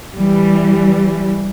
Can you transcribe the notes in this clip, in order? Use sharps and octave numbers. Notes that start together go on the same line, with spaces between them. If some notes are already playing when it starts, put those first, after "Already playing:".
E3 G3